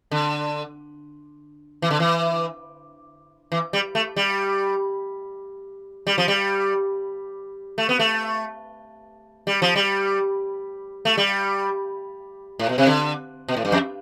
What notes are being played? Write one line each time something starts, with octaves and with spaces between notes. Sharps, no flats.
D3
E3
D3
E3
E3
G3
A3
G3
G3
F3
G3
A3
B3
A3
G3
F3
G3
A3
G3
A2
B2
C3
D3
B2
A2
G2
F2